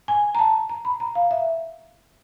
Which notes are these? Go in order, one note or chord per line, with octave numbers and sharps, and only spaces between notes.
G#5
A#5
A5
A#5
B5
A#5
F5
E5